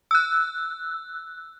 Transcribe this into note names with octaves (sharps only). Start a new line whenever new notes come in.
E6 F#6